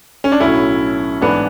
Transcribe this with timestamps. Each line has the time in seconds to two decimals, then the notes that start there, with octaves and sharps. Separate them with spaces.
0.24 C#4
0.32 D4
0.40 B1 A2 F#3 C#4 E4
1.21 A1 G#2 E3 B3 D4